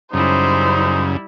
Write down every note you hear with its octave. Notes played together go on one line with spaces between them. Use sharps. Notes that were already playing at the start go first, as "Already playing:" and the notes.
F#2 C#3 G3 D#4 E4 C5